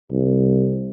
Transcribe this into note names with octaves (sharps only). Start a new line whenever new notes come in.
C2